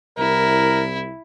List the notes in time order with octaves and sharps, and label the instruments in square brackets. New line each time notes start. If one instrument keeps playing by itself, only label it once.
[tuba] C2 [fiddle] E4 [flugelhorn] A#4